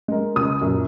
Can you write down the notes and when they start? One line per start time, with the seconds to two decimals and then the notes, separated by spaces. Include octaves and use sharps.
0.08 G#3 A#4
0.36 C#2 C#4 D#6
0.62 F#2 A#2